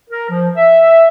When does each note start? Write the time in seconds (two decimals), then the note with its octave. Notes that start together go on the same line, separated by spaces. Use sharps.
0.10 A#4
0.30 F3
0.56 E5